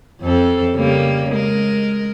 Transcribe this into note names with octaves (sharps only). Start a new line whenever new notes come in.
F2 C4 A4
C#3 G3 A#3
G#3 A#4